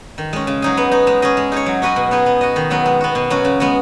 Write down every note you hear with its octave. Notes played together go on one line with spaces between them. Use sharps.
D#3
G#3 C#4
C#3
F#3 D#4 G#4
B3
D#4 F#4
G#3
C#4 G#4 D#5
G#3
D#4 G#4 C#5
F#3
C#4 F#4 B4 D#5
B2
B3 D#4 G#4
B3
F#4 D#5
D#3
F#3 B3 F#4
G#3
B3 F#4
B2
F#3 C#4 F#4
C#3
G#3 B3 F#4